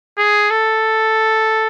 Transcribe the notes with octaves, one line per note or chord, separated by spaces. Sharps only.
G#4
A4